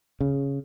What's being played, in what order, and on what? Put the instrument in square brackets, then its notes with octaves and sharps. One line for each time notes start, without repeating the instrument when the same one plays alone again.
[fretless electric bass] C#3